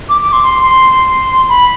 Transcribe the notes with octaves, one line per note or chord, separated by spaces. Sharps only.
D6
D6
C6
C6
C6
B5